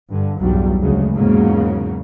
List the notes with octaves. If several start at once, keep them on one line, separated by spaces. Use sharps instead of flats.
G2 D3
B1 E2 G2 F#3 G3
D2 G2 C#3 F#3 G#3
E2 G#2 C#3 F#3 A#3